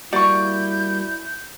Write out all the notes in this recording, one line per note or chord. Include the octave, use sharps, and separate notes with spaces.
G3 A#3 E4 F#4 D5 C#6 G6